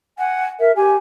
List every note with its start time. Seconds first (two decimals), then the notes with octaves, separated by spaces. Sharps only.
0.18 F#5 G#5
0.60 A#4 E5
0.76 G4 G#5